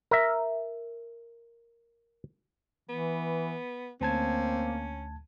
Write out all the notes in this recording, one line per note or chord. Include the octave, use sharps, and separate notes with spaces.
A#4 E5
E3 B3
D2 A#3 C4 C#4 A5 G#6